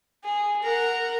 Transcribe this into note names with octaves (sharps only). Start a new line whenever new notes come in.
G#4
A#4 F#5